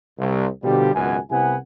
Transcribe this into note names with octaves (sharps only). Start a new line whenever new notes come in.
C2
B2 D3 F3 G3 G4
G#1 C#2 F#2 B2 F#5 G#5
C2 C3 B3 E4 F#5 G#5